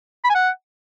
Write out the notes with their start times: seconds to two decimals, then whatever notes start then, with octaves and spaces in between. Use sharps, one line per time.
0.25 B5
0.30 G#5
0.35 F#5